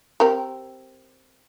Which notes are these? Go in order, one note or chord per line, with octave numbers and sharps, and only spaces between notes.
C4 G4 A#4